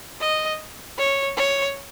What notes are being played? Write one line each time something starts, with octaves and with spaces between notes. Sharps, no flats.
D#5
C#5
C#5